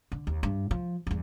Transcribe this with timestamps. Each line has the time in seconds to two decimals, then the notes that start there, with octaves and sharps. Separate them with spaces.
0.12 D3
0.27 D#2
0.43 G2
0.71 F3
1.07 E2 G2